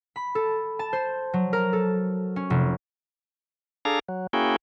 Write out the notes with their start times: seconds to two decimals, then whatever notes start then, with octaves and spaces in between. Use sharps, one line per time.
0.16 B5
0.35 A4
0.79 A5
0.93 C5
1.33 F#3
1.53 A#4
1.73 A4
2.36 C#4
2.50 F1
3.85 D4 G#4 A4 F5 A#5
4.09 F#3
4.33 A#3 C#4 E4 F#4 G#4 G5